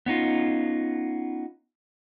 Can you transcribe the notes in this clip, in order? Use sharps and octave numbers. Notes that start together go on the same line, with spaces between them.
B3 C#4 D#4 F4